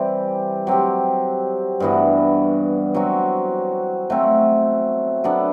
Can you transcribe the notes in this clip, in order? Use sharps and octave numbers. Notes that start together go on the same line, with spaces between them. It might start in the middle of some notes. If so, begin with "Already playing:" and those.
Already playing: E3 G3 C4 G4
F#3 C4 G4
G2 E3 B3 F#4
F#3 C4 F#4
F#3 A3 C4
F#3 B3 D4 A4